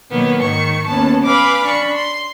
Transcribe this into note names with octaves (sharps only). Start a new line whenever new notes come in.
B2 D#3 F#3 A#3 B3
G#2 D#3 C#6
D#2 B3 C#4 A5
B4 F5 G#5 B5 D6
D4 B5 C#6
C6